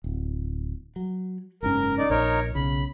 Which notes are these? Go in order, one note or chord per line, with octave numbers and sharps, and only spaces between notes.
D1
F#3
F#1 G#2 C#4 A#4
D#4 D5
A#1 D#4 A#4 C#5
B1 C#3 B5